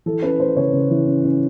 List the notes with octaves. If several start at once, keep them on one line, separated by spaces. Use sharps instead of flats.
E3 A4
C#4 B4
A3 C5
C#3 C#5
C#3
E3
C#4
C#4